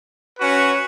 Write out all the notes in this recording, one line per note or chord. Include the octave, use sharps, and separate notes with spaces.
C#4 F#4 B4